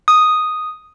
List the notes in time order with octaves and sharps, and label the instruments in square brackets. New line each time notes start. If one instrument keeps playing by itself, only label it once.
[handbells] D#6